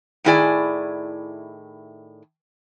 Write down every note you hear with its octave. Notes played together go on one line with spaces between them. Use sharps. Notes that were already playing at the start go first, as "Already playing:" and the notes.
A2 D#3 E4 G#4 D5 G#5